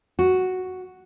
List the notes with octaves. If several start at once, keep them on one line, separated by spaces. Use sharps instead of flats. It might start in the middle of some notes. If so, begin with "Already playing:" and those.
F#4